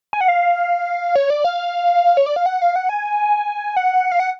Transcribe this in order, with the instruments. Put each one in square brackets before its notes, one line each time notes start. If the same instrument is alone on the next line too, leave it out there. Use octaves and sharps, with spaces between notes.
[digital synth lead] G#5
F#5
F5
C#5
D5
F5
C#5
D5
F5
F#5
F5
F#5
G#5
F#5
F5
F#5